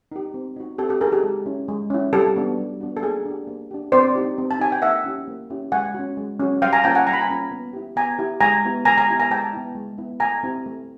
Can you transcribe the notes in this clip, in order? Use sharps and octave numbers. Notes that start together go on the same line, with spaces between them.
D#4 G4
C4
D#4 F#4
C4 G4 A4
G4 A4
D#4 F#4 G#4 A#4
G4 A4
G#3
C#4 E4
G#3
C#4 E4
G3 G4 A4
B3 D4 F#4
G3
B3 D4 F#4
A4
A#3 G#4
D4 G4
A#3
D4 G4
C4 C5 D5
D#4 G4
C4
A5
D#4 G4 G#5
G5
A#3 E5 F#5
C#4 E4 G4
A#3
C#4 E4 G4
G#3 F#5 G#5
C#4 F#4
G#3
C#4 F#4
G3 F5 G5
G#5 A#5
A#3 C#4 F4 G5 A5
F#5 G#5
G3 A#5
B5
G#5 A#5
A#3 C#4 F4
B3
E4 G4
B3 G#5 A#5
E4 G4
G#3 G#5 A#5
B3 E4 G4
G#3 G#5 A#5
G#5 A#5
B3 E4 G4
G#5 A#5
G#3 G5 A5
B3 E4
G#3
B3 E4
A3 G#5 A#5
C4 E4 G4
A3